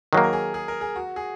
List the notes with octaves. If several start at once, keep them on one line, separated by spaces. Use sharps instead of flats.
D#3 F#3 A#3 G#4
A#4
G#4
G#4
A#4
G#4
F#4
G#4